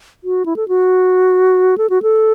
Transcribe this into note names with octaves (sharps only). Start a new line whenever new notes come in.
F#4
E4
A4
F#4
A4
F#4
A4